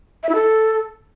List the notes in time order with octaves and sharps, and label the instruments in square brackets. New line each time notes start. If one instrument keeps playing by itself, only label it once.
[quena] E5
E4
A4